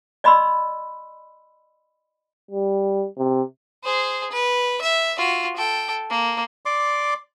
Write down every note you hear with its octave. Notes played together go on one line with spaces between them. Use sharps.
D5 D#5 B5 C6 E6
G3
C3
G#4 C5
B4
E5
F4 F#4
A4 G5
A#3
D5 C6 D6